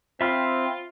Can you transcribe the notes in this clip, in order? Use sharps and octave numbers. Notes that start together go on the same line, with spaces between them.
C4 F4 E5 B5 F6